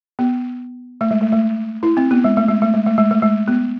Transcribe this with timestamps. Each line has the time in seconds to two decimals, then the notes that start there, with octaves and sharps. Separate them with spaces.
0.19 B3
1.01 A3
1.11 G#3
1.21 A3
1.32 A3
1.83 E4
1.97 C4
2.11 B3
2.24 G#3
2.37 A3
2.49 G#3
2.62 A3
2.74 G#3
2.86 A3
2.98 G#3
3.11 A3
3.23 G#3
3.48 B3